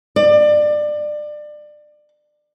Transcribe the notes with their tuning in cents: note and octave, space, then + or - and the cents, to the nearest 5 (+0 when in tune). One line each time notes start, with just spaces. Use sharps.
D5 +25